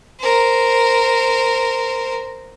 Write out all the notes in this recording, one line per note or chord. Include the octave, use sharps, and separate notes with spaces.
A#4 C5